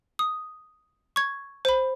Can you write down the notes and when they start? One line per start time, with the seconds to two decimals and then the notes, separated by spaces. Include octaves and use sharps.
0.19 D#6
1.16 C#6 G#6
1.65 C5 B5